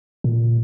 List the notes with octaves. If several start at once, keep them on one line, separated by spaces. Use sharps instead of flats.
A#2